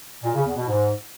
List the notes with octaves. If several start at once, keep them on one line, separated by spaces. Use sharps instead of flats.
A#2
C#3
E2
B2
G#2